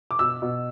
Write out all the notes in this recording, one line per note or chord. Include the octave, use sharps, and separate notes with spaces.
D6
B2 E6
B2